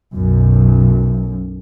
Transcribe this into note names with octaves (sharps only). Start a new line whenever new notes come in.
B1 F#2